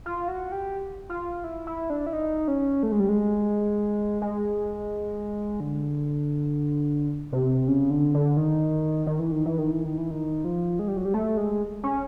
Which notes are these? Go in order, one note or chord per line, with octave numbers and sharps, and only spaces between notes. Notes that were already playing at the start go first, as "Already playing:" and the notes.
F4
F#4
G4
F4
E4
E4
D4
E4
D#4
C#4
A3
G#3
G3
G#3
G#3
D3
C3
C#3
D3
D3
D#3
D#3
E3
D#3
E3
D#3
E3
D#3
E3
D#3
F3
G#3
G3
F#3
G3
A3
G#3
C#4